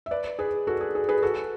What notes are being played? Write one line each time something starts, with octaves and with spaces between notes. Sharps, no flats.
E5
B4 D5
G#4 B4
F#4 A4
G#4
G#4
G#4 B4
F#4 A4